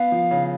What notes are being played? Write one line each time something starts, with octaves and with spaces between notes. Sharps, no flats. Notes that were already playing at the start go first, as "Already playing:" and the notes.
Already playing: B3 F5
F3
C#3